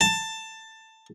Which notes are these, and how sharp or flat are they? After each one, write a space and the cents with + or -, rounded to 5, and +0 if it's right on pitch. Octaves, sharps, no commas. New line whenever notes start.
A5 +15